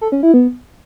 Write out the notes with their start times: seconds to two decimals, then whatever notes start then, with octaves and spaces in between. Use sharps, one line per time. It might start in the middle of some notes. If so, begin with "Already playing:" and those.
0.01 A4
0.12 C#4
0.23 E4
0.34 B3